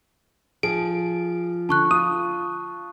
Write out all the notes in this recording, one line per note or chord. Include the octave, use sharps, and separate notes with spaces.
F3 G#4 D7
D3 A5 C#6 F#6
F4 D#6